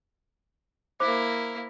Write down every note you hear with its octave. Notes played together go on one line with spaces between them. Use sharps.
A#3 E4 C5 D6